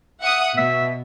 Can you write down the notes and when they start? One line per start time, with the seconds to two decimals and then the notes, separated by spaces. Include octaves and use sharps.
0.21 E5 F#5 D#6
0.58 B2 E5